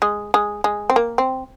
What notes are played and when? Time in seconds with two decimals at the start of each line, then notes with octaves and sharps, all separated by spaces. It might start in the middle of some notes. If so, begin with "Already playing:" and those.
0.02 G#3
0.34 G#3
0.64 G#3
0.90 C4
0.96 A#3
1.18 C4